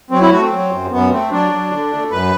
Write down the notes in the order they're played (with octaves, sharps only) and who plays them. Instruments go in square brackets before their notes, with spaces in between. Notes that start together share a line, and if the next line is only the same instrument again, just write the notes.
[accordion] F#3 C4
E4
A3 F#4
C4
F#3
F#2
F#2 B3
A3 C4
F#3 D4
F#3
D3
A3
F#2 B4